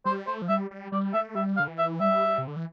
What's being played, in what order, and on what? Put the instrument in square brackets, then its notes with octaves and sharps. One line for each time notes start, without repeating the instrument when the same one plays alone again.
[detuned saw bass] G3 [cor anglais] C5
[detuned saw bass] A3 [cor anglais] C5
[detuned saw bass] F3
[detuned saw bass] G3 [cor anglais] E5
[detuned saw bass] G3
[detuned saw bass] G3 [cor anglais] D5
[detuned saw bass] A3 [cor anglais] E5
[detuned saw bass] G3 [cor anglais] E5
[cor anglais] F5
[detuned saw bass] D3
E3
[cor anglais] E5
[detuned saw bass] G3 [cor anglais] E5
[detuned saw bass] C3
D3
E3